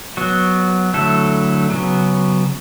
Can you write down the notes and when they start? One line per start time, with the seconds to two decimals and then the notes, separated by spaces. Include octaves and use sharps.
0.17 F#3 B3 F#4
0.93 D3 F#3 A3 E4 A4
1.70 C#3 F#3 B3